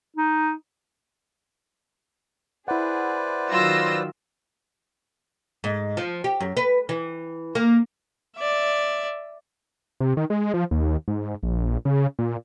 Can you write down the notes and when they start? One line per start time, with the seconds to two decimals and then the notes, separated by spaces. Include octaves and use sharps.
0.17 D#4
2.68 E4 G#4 B4 C5 D5 F#5
3.51 D#3 F#3 F4 E6 A#6
5.64 G#2
5.97 F3
6.24 G4
6.40 F#2
6.57 B4
6.89 E3
7.55 A#3
8.37 D5 E5
10.00 C3
10.17 D#3
10.30 G#3
10.54 F3
10.71 D#2
11.08 G#2
11.43 A#1
11.85 C#3
12.19 A#2